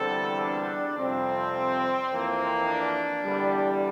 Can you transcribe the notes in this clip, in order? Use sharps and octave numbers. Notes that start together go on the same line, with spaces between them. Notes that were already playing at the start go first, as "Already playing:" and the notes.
Already playing: E2 D3 G3 C4 A4
D4
F2 C3 G3 C4
F2 E3 A#3
D4
E2 D3 G3